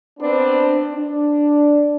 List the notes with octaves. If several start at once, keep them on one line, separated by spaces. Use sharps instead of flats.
B3 C4 D4
D4